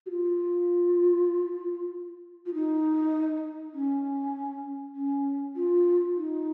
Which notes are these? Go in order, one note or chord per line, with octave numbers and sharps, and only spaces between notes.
F#4
F4
F4
D#4
C#4
C#4
F4
D#4